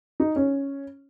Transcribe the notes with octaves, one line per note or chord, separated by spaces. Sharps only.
D#4
C#4